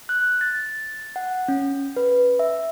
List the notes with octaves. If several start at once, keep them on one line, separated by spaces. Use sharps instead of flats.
F#6
A6
F#5
C#4
B4
E5